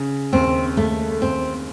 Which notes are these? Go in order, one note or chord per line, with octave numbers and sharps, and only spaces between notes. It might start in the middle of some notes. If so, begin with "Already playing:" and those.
Already playing: C#3
D#2 C4
D#2 A3
D#2 C4